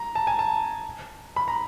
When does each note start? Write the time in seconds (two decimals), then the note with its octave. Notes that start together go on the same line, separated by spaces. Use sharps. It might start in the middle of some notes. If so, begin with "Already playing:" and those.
Already playing: A#5
0.15 A5
0.27 G#5
0.39 A5
1.36 B5
1.48 A#5